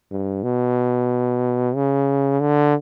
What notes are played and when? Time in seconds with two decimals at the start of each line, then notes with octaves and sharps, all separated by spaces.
0.11 G2
0.43 B2
1.75 C#3
2.40 D3